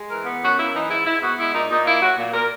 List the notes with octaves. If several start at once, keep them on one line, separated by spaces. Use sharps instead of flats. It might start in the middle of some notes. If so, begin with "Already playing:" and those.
Already playing: G#3
E3 A#4
B3
F#2 F#4
A#3 E4
E3 D#4
G#2 E4
G#2 E4
B3 F#4
G#3 E4
A#2 D#4
A#2 D#4
A#3 E4
F#3 F#4
A#2
A#2 A#4